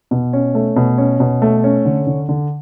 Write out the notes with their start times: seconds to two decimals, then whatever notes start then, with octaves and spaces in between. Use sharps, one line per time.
0.11 B2
0.33 C#4
0.55 A3
0.76 B2
0.98 C#4
1.20 B2
1.42 A3
1.64 C#4
1.85 D3
2.07 D3
2.29 D3